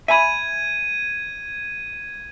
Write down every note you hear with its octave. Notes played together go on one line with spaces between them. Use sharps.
E5 G#5 B5 G#6 D#7